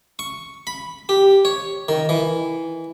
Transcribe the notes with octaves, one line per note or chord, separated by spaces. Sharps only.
C#6
B5
G4
C#5
D#3
E3